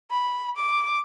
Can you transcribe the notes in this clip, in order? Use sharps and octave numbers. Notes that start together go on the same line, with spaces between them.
B5
D6